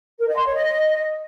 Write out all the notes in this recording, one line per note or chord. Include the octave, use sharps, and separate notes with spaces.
A#4
D#5
C6
C#5
D#5